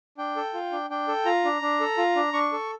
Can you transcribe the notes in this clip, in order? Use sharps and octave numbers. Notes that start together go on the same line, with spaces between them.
D4 G5
A4
F4
D4
D4 G5
A4
F4 A#5
D4
D4
A4
F4
D4
D4 C#6
A4